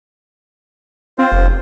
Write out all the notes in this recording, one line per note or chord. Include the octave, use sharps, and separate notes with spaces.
C4 F4 C5
F1